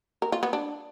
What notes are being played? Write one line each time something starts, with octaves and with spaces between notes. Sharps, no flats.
A#4
F4
B3
D4